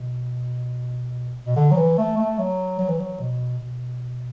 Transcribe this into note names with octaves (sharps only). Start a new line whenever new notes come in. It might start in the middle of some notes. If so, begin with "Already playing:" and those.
Already playing: B2
B2
D3
F#3
E3
A3
A3
F#3
F#3
E3
F#3
B2
B2